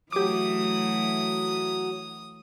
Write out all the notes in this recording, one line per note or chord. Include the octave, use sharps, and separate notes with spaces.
E3 F#3 A3 G4 D6 D#6